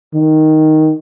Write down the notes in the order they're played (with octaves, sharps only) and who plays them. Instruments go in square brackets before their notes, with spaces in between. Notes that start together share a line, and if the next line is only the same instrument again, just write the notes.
[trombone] D#3